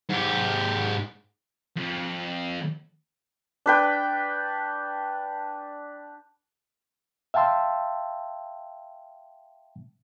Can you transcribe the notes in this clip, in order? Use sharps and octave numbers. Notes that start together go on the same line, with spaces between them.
G#2 G4
F2
D4 B4 G5
E5 F5 G5 A5 C6 E6